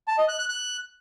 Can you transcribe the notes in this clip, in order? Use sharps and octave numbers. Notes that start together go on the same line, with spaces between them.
A5
D#5
F#6
F#6
F#6